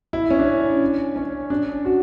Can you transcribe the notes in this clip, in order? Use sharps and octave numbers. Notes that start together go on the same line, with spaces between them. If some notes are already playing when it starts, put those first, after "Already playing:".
E4
C#4
D4
C#4
D4
F#4